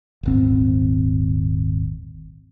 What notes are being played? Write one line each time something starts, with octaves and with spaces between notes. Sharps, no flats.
D#1 G#1 C4